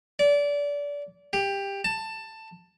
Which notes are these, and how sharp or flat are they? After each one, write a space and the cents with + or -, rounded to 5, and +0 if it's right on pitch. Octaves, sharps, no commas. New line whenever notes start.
D5 -25
G4 +15
A5 +15